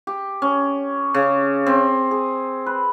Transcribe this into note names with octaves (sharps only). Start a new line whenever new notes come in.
G4
C#4
C#3
C4
G#4
B4